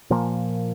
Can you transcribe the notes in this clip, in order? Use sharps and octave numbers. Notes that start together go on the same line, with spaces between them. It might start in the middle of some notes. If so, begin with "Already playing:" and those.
A#2 F3 A#3